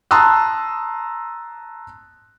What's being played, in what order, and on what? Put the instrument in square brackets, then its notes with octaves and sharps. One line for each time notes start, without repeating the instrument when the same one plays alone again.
[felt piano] A5 A#5 C6 D#6 E6 F#6